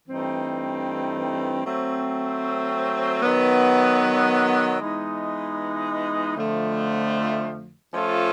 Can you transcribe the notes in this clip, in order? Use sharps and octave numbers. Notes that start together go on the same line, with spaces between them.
G2 E3 A3 C4 D#4
F#3 A3 C4
D#3 F#3 B3
E3 G#3 B3 D#4
F2 D3 F3 A3
F3 A3 C#4 F4 A4